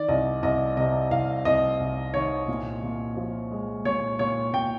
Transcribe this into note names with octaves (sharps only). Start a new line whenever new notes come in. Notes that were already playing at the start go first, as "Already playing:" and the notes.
Already playing: D#3 D5
C2 D#5
C2 D#5
C3 D#5
C2 F5
C2 D#5
C2
D#3 C#5
A#2
A#2
F3
G#3
A#2 C#5
A#2 C#5
A#2 G5